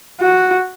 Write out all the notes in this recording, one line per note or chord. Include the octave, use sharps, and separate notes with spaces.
F#4